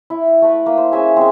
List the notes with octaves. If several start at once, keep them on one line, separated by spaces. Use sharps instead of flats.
E4
A3 B4
A#3
C5
C#4 G#4 E5 G#5
G#3 C4